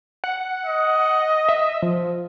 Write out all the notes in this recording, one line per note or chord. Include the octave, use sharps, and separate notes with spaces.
F#5
D#5
E5
F3